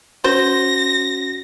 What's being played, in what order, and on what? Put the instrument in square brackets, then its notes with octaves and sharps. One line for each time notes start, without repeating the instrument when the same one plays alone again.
[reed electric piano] C#4 F#4 [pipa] C5 [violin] A#6